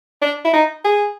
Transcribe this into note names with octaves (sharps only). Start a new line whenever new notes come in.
D4
E4
D#4
G#4